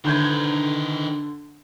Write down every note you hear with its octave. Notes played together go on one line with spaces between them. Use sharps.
D3 D#3 B4 G6 G#6